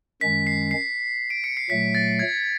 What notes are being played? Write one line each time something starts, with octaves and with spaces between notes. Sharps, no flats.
F#2 D#3 G#3 C#4 B6
C7
C7
D7
C#7
C7
A#2 F#3 A3 B6
A6
G#6